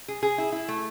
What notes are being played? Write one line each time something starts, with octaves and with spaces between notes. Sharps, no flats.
G#4
G#4
E4
E4
A3